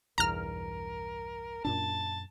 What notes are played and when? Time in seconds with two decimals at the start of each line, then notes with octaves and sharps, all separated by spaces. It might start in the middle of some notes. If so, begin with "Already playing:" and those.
0.18 B1 E2 G2 A#4 A#5 F6
1.65 F#2 A#2 D4 A5